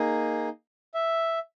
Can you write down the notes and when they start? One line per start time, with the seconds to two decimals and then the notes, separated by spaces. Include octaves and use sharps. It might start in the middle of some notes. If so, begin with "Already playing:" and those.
Already playing: A#3 D#4 G#4
0.94 E5